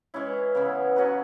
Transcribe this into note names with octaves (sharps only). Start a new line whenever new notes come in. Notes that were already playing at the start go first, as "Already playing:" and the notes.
E3 G#3 C#4 E4
C#3 E3 B3 E4
F#3 C#4 F#4 B4